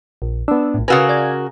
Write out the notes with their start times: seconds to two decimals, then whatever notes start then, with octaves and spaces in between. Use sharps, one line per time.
0.22 A#1
0.48 B3 D4 E6
0.74 A#1 A2
0.88 C#3 F#4 A#4 B4 F5 G#5 E6
1.09 D5 G#6